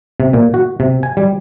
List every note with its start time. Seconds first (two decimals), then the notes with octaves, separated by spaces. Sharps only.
0.20 C3
0.33 A#2
0.54 F#4
0.80 C3
1.03 G#5
1.17 G3